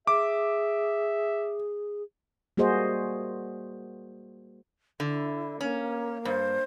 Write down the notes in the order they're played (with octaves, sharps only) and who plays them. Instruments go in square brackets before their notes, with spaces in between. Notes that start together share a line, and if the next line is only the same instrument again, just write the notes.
[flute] G#4 [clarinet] E5 [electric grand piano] D6
[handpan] G3 A#3 F#4 G#4 C5 D#5
[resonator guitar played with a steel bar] D3 [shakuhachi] E4
[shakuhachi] A#3 [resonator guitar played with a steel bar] C#4
[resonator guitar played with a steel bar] G2 [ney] C5